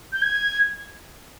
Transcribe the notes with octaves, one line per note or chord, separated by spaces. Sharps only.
G6
G#6